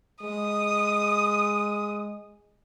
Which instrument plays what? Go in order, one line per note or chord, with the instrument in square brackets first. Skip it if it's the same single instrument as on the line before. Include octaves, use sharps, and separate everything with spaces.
[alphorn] G#3 [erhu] D#6